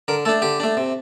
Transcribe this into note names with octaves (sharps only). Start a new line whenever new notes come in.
D3 A#4
A3 D4 A4
D3 G4
A3 D4
C3